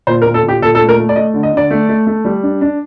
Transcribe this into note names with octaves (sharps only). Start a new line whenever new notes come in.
A#2 C5
A#4
A#2
A4
A#2 G4
A#2 A4
A4
A3
A#4
A3
D5
A3 D#5
D3
D#5
D3 D5
A3
A3
A3
G3
D4
D4